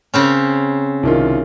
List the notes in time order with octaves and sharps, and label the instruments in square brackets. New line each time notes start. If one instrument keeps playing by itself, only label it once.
[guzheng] C#3 C4 C#4
[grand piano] C2 D#3 F4